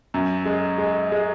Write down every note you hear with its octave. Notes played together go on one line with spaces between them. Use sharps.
F#2
G#3
G#3
G#3